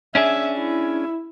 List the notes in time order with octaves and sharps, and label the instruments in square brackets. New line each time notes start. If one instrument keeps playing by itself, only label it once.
[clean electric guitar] C#4 D4 G#4 [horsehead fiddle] E5
[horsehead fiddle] E4